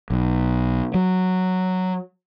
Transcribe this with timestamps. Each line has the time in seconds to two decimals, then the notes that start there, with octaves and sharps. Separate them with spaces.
0.10 B1
0.94 F#3